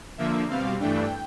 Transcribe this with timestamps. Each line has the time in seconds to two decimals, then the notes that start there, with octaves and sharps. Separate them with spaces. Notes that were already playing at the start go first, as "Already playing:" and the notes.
0.18 D3 F3 A#3 E5
0.49 B2 G3 C4 F5
0.80 G2 E3 A3 D4 G5